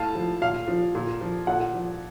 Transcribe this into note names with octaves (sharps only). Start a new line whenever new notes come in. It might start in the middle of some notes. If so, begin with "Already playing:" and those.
Already playing: A2 F5 A5
F3
A#2 F5
F3
A#2
F3
A#2 F#5
F3